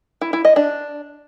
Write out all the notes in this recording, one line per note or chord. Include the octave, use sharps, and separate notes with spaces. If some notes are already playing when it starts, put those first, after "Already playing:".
E4
E4
D#5
D4